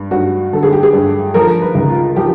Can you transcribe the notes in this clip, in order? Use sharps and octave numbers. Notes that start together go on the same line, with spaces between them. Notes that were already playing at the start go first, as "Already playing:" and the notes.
Already playing: G2
G2 F#4
D3 A4
G#4
G4
G#4
G2
F3 A#4
B4
C#2
F4
F3 G4